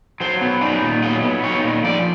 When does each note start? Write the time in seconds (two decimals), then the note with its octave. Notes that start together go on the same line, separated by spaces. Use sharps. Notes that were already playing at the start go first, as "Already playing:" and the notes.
0.20 F#3 C5
0.41 B3
0.61 D#4 D5
0.82 A#2
1.02 F#3 D#5
1.23 B3
1.44 D#4 C#5
1.64 A#2
1.84 F3 D5